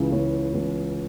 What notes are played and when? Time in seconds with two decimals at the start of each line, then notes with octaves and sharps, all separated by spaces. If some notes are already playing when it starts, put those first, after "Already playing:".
Already playing: C#2 C#3 E3
0.12 C#2 C#3 E3 C#5
0.53 C#2 C#3 E3